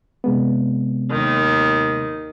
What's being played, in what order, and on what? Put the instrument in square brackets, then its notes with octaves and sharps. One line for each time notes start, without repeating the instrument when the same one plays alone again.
[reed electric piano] C3 G#3 B3
[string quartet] D#2 D#3